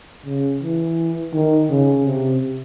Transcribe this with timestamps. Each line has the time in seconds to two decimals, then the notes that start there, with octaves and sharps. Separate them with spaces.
0.26 C#3
0.62 E3
1.33 D#3
1.69 C#3
2.05 C3